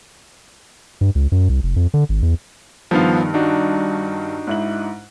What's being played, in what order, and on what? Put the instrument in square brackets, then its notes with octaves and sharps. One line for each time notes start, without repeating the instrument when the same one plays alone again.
[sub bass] G2
C#2
F#2
C2
F1
F2
D3
G#1
E2
[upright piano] G2 D#3 F7 [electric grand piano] F3 B3 F5
[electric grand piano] D4 D#4 F#4
[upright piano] G#2 E4 F#7